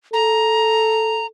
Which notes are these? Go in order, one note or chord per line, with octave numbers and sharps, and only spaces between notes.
A4 A#5